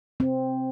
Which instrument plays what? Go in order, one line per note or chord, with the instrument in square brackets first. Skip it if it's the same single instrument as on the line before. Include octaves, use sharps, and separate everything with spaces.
[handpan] C4